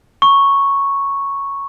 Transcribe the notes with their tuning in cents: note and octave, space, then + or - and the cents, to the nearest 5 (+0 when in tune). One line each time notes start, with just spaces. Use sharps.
A#5 +20 C#6 -5